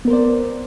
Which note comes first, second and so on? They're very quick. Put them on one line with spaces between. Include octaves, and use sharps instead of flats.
B3 A#4 C5 D5